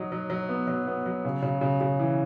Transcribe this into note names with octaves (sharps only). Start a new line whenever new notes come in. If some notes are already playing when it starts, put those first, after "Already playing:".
Already playing: F#3 D#4
F#3
F#3
B3
F#3
B3
F#3
C#3
C#3
C#3
C#3
E3